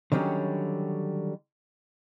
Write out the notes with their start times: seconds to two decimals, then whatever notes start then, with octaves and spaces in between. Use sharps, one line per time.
0.12 D3 D#3 F#3 G3 C#4